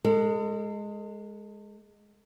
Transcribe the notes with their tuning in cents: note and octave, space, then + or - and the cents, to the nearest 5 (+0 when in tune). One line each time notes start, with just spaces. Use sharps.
G#3 +0 A4 +40